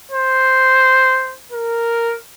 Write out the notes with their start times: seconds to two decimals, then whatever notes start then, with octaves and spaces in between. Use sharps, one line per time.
0.11 C5
1.52 A#4